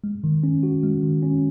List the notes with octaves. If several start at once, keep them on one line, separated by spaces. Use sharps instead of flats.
G#3
D#3
C#4
F#4
G#3
D#3
C#4